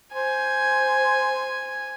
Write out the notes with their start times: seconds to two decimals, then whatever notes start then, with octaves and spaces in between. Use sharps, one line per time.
0.14 C5 G#5